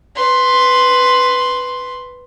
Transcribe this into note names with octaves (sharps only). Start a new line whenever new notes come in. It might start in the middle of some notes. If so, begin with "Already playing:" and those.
B4 C6